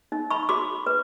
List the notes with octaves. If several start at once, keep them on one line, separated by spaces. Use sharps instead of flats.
D#4
B5 C#6
F#4 C6 D6
B4